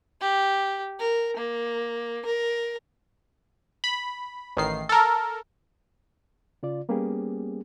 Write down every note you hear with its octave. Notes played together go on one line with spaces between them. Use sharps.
G4
A#4
A#3
A#4
B5
A1 D#3 C7
A4 A#4
C#3 F4 D5
G3 A#3 B3 C#4 G4 G#4